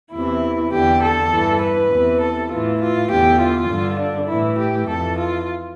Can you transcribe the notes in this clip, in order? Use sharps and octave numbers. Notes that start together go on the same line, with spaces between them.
E2 C3 E3 E4
E2 D3 G4
A4
G2 E3
B4
E2 C3 E3
A4
A2 E3 F4
F4
E2 D3 G4
F4
G2 D3
D4
A2 E3 E4
G4
F2 E3 A4
F4